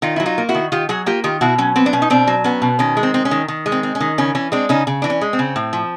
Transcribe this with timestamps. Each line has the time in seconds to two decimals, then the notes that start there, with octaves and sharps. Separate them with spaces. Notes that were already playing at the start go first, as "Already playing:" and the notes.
0.02 D#3 D#4 F4
0.16 F#3 E4
0.26 D#4 F4
0.38 A#3
0.49 E4 F#4
0.55 D#3
0.72 D#3 F4 G4
0.89 F#3 F#4 G#4
1.06 A#3 F4 G4
1.24 D#3 F4 G4
1.41 B2 E4 F#4
1.58 F#3 C#4
1.76 B3 C4
1.86 D4
1.93 B2 C#4
2.02 D#4
2.10 B2 C4 D4
2.27 F#3
2.44 B3 C#4
2.62 B2
2.79 D#3 C#4
2.97 G#3
3.03 C4
3.14 C4
3.25 C#4
3.31 D#3
3.48 D#3
3.66 G#3
3.72 C4
3.83 C4
3.95 C#4
4.00 D#3
4.18 C#3 C#4
4.35 E3 C#4
4.52 G#3 C4 D4
4.69 C#3 C#4 D#4
4.87 C#3
5.02 E3 D4
5.10 C#4
5.21 G#3
5.33 C4
5.39 C#3
5.56 A2
5.73 F3